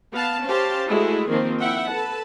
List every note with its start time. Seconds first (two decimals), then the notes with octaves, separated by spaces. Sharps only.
0.11 B3 F5 A5
0.47 C#4 G4 C5 F5 A5
0.89 G#3 A3 E4 F#4 G#4
1.30 D#3 F3 A#3 C4
1.59 E4 E5 F#5 G5
1.91 A4 B4 A5